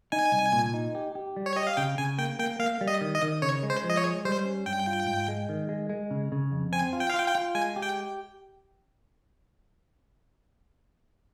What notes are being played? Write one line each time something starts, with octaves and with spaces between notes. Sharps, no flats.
D#4 G#5
C2
A#2
D#4
G4
G4
G3
C#5
G4 D#5
F5
C#3 G5
C#3 G#5
A#3 G5
A#3 G5
A#3 F5
G3
D#5
D#3
D#5
D#3
C#3 C#5
G#3
C5
F3
D#5
C#5
G#3
G3 C5
C#4
G2 G5
F4
G#2
G#3
D#3
G#3
G#3
C#3
C#3
F2
C4 G#5
F4
G5
F5
F4 G5
G5
F4
G#3 G#5
G4
G5